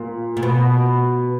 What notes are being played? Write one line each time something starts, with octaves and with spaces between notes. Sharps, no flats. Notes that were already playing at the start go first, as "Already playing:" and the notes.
Already playing: A#2
A#2
B2